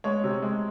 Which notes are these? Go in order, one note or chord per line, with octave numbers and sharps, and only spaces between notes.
G#3 C#5
C3
G#3